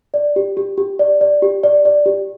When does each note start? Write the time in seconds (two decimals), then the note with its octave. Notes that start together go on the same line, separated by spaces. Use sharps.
0.14 D5
0.36 G4
0.57 G4
0.78 G4
0.99 D5
1.21 D5
1.42 G4
1.63 D5
1.85 D5
2.06 G4